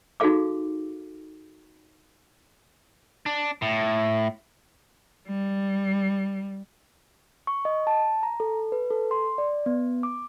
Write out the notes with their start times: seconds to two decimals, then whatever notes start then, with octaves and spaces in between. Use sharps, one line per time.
0.20 D#4 F#4 G#4 A4 F5 D6
3.26 D4
3.62 A2
5.28 G3
7.47 C#6
7.65 D#5
7.87 A5
8.23 A#5
8.40 A4
8.72 B4
8.91 A4
9.11 C6
9.38 D5
9.66 B3
10.03 D6